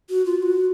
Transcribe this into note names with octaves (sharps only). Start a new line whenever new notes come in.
F#4
F4
F#4